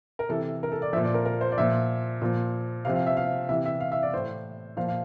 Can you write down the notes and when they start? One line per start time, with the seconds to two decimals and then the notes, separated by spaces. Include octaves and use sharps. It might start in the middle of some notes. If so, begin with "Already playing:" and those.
0.19 A#4
0.29 C3 E3 A4
0.63 A#4
0.72 A4
0.82 D5
0.93 F3 E5
0.97 A#2
1.04 D5
1.14 A#4
1.25 A#4
1.41 C5
1.52 D5
1.58 A#2 F3 E5
2.22 A#2 F3
2.85 C3 F3 F5
2.96 F5
3.07 E5
3.17 F5
3.49 C3 E3 E5
3.66 E5
3.80 F5
3.92 E5
4.02 D5
4.13 A2 E3 C5
4.77 A#2 F3 F5
4.88 F5